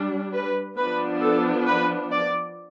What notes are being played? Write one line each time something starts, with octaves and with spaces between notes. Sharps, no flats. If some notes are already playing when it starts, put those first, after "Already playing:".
Already playing: G3 D4
B4
F3 B3 D4 B4
A4
B4
D5